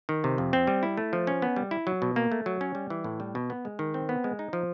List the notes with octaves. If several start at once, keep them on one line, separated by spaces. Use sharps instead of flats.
D#3
C3
F2
C4
G3
E4
A3
F3
C#4
B3
G3
E4
F#3
B2
A#3
A3
F#3
C#4
G3
E3
A2
G3
B2
B3
G#3
D#3
C4
B3
G#3
D#4
F3